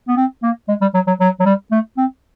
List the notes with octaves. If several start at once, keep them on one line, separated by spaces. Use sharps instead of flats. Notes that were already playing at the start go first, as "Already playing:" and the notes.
B3
C4
A#3
G#3
G3
F#3
F#3
F#3
F#3
G3
A3
C4